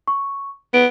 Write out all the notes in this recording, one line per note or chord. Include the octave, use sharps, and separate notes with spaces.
C#6
B3 D7